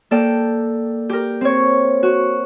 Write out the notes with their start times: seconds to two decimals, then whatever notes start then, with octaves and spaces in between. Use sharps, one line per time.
0.11 A#3 A4 D5 G5
1.09 G4 A#4
1.41 C4 C#5
2.03 F#4